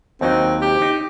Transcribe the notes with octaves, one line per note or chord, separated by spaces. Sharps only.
D#2 F#3 C4 D#4
G4
D#4